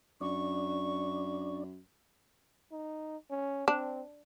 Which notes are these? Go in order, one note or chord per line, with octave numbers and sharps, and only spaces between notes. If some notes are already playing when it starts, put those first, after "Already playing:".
F#2 D4 D5 C#6
D#4
C#4
C4 D4